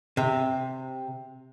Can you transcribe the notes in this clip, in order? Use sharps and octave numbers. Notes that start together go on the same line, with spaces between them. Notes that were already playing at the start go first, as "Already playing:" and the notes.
C3